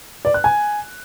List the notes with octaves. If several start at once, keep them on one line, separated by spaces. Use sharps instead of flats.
D5
F#6
G#5